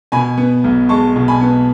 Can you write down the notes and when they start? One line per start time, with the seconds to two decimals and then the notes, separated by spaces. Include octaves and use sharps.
0.12 B2 G#5 B5
0.38 B3
0.64 B1
0.89 G#3 A5 C#6
1.16 B2
1.28 G#5 B5
1.41 B3